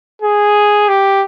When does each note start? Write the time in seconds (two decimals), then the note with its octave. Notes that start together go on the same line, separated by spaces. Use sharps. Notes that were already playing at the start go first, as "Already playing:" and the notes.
0.22 G#4
0.89 G4